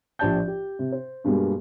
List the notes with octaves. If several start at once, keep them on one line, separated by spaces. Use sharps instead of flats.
A#1 F3 G4 D5 A5 G6
G4
C3
C5
G2 B2 G3 G#3 A#3 B3